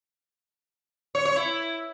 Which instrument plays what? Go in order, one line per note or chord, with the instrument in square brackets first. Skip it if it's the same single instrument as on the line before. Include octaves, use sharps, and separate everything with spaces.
[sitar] C#5
C#5
E4